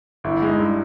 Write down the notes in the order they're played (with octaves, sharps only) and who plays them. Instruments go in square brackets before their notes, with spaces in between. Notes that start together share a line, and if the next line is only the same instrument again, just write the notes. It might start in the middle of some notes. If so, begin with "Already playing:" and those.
[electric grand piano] G1 [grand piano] E4
[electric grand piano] G#3 [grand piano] D#4
[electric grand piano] G2